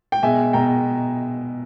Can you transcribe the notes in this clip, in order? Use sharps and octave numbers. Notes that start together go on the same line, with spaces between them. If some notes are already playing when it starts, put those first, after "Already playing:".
G5
B2 G#3 E5 G#5
B2 G#3 G5 A#5